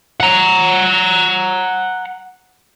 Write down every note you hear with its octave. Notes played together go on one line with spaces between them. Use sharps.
F#5 A#5